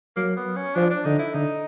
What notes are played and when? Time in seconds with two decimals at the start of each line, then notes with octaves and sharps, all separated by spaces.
0.16 F#3 A#3
0.36 B3
0.56 C#4
0.75 F3 D4
0.90 D4
1.05 D3 D#4
1.19 E4
1.34 D3 D#4